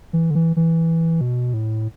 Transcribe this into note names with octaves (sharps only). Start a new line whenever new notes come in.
E3
D3
E3
E3
B2
A2